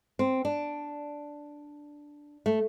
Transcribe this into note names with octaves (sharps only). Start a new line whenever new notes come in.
C4
D4
A3